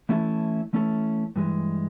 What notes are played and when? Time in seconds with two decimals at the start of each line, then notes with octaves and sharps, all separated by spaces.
0.09 E3 A3 C#4 E4 A4
0.73 E3 A3 C#4 E4 A4
1.36 G2 E3 G#3